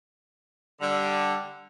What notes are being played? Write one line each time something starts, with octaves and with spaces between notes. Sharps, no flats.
D3 G3